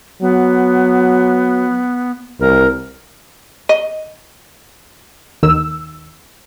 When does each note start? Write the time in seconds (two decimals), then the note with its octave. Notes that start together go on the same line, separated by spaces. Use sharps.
0.22 F#3 B3
2.40 C2 A#4
3.69 D#5
5.43 D#2 D#3 E6